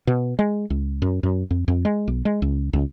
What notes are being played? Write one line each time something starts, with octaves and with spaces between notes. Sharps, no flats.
B2
G#3
C#2
F#2
F#2
F2
F2
G#3
B1
G#3
C#2
C#2